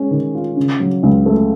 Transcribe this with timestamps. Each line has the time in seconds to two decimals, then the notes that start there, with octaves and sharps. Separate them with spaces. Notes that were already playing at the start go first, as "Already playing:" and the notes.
Already playing: G#3 C#4
0.11 D#3
0.35 F4
0.56 C#3
0.80 F#3
1.03 C#2
1.26 A3